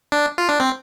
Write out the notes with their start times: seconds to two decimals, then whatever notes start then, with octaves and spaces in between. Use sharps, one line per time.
0.12 D4
0.38 F4
0.49 D4
0.60 C4